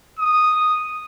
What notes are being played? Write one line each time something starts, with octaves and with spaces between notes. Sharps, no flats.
D#6